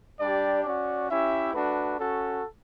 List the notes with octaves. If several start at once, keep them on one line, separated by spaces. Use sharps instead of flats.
G3 D4 G4 D5
C#4 F#4 D5
C#4 E4 G4 E5
A3 D4 F#4 B4
C#4 F#4 A4